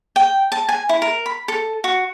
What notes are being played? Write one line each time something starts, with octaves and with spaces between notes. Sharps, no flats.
G5
A5
G#5
E4
A#4
B5
A4
F#4